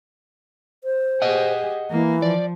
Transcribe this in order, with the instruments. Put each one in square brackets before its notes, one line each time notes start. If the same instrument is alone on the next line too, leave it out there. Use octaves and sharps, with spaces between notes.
[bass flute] C5
[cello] G4 G#4 [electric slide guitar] D#5 F#5
[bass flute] E3 [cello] A#3
[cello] F3 [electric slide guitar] D5